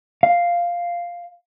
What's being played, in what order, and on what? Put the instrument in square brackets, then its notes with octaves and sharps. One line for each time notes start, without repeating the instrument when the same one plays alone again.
[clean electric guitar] F5